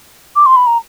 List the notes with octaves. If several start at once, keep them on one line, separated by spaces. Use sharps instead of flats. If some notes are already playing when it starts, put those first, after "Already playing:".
D6
C6
B5
A#5